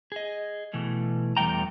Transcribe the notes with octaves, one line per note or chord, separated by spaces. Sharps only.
G#4 D#5
B2 E3 A3
E2 G3 A3 G5 A#5